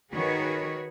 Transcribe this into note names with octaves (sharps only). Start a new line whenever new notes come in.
D#3 F#4 G#4 A#4 B4 C#5